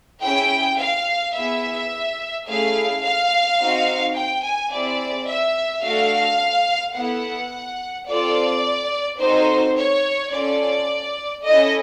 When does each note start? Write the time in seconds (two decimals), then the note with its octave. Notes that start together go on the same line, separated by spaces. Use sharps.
0.23 C#4 E4 G#4 G5
0.79 F5
1.35 B3 E4 G#4 E5
2.47 A3 C#4 E4 G#4 F5
3.03 F5
3.59 C4 D#4 F#4
4.16 G5
4.44 G#5
4.72 C4 E4 G#4 D5
5.28 E5
5.83 A3 D4 F#4 A4 F5
6.96 B3 E4 A4 F#5
8.08 C4 F4 A4 D5
9.20 C4 D#4 F#4 A4 C5
9.76 C#5
10.32 C#4 F4 A4 D5
11.44 C#4 E4 A4 D#5